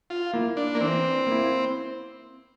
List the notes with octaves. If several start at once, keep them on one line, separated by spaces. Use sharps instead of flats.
F4
A#3 E4
D4
A#3
E3 C4
A#3 E4